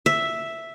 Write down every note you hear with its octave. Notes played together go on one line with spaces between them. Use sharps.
E5